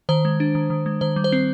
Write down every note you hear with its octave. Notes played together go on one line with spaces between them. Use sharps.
D#3 C5
G#3
D4
D#3
D#3
G#3
D#3 C5
G3
C5
C4